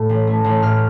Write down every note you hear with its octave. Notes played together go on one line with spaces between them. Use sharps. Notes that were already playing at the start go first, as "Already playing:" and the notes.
Already playing: A2 A3
A1
A3
A1
A2 F6